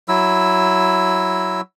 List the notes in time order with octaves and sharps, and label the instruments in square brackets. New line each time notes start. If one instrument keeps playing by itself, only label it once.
[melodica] F#3 E4 E6